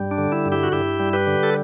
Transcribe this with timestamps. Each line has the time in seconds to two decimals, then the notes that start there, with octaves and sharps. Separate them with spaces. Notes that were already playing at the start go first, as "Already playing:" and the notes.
Already playing: G2 G3
0.11 D4
0.18 D3
0.32 E4
0.46 G2
0.52 E4 G4
0.63 F#4
0.72 G2 E4 G4
1.00 G3
1.13 G4 B4
1.27 D3
1.43 A4